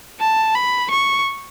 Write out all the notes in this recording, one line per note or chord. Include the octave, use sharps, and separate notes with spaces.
A5
B5
C#6